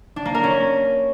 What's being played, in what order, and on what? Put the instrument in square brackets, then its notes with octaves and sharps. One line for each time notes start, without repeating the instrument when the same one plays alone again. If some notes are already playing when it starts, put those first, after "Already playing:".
[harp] D4
A#3
A#4
C#4